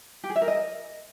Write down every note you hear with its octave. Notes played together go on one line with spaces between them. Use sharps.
G4
G#4
E5
A#4
D#5